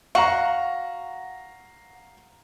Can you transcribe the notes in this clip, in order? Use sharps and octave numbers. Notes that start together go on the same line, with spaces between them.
F#4 F5 F#5 A#5 C#6